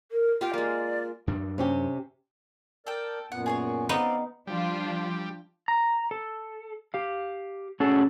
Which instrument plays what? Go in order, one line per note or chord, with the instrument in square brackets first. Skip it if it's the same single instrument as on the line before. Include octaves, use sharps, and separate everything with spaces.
[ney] A#4
[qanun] F4 G4 F5 [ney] G5
[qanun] G#3 A#3 [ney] D5
[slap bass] F#2 D4
[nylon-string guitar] C3 C#4 G4
[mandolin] A4 G5 [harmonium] A#4 D5
[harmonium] F#2 A#2 B3 [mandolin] F#5
[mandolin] G#4 C5 C#5
[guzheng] B3 D#4 [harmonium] C4 F5 [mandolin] C#5 D5
[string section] F3 D4 F4 [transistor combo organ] G3
[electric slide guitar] A#5
A4
G4 F5
A3 C#4 F#4 G#4 A4